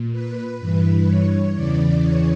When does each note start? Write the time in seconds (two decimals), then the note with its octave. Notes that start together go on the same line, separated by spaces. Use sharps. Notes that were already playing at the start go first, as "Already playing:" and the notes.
Already playing: A#2
0.12 B4
0.59 G2 E3 B4
1.07 C#5
1.54 E2 C#3 E3 D5
2.02 C#5